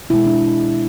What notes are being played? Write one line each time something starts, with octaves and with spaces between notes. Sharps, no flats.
B2 G#3 E4
D4